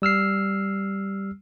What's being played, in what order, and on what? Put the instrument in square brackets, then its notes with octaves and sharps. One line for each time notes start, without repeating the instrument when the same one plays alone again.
[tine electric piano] G3 E6 F6 C7